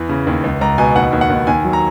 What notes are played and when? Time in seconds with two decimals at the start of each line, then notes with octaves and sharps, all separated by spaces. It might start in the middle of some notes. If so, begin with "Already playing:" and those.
Already playing: E2 E3
0.09 C#3
0.27 D#2
0.44 C#2
0.61 C#2 A#5
0.78 B2 G#5
0.96 D#2 F#5
1.12 D#2
1.21 F#5
1.30 D#2
1.47 D#2 G#5
1.64 F#3
1.73 A#5